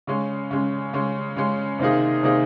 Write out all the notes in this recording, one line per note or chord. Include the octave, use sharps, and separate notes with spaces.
C#3 G#3 C#4
C#3 G#3 C#4
C#3 G#3 C#4
C#3 G#3 C#4
C3 D#3 A#3 D#4 G#4
C3 D#3 A#3 D#4 G#4